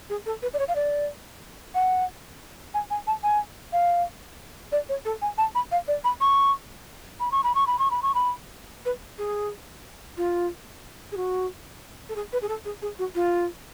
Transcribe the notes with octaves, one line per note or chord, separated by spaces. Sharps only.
G#4
A4
B4
D5
C#5
F5
D5
F#5
G#5
G#5
A5
G#5
F5
D5
C#5
A4
G#5
A5
B5
F5
D5
B5
C#6
B5
C#6
B5
C#6
B5
C#6
B5
C#6
B5
B4
G#4
F4
G#4
F#4
A4
G#4
B4
G#4
A4
G#4
G#4
F#4
F4